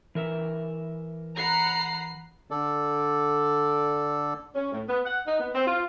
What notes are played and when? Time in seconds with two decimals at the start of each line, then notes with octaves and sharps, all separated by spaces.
0.15 E3 A#4 E5
1.37 F#5 A#5 B5 C7
2.51 D3 A4 D5
4.55 C#4
4.72 A2
4.89 B3
5.05 F#5
5.27 D#4
5.40 B3
5.55 C4
5.67 F4